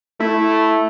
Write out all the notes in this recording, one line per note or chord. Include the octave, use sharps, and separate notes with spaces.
A3 E4